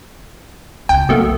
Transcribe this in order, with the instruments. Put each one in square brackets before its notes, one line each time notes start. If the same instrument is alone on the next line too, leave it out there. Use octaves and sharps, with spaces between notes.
[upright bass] C#2 C#3 [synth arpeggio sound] G5
[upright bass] B1 F#2 [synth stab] B2 A3 A#3